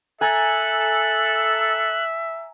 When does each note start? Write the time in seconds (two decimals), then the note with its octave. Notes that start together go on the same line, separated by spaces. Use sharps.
0.21 A4 E5 G#5 A#5 F#6